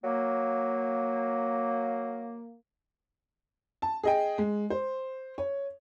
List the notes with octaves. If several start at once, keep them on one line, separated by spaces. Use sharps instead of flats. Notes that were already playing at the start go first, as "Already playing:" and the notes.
F#3 A#3
A5
G#4 D#5 G5
G#3
C5
C#5